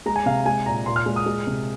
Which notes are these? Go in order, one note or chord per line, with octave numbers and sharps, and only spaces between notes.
G#3 A#5
G#5
C3 F5
G#3 G#5
A#2 A#5
A#2 C6
F6
G#3
D#6
G#3
C3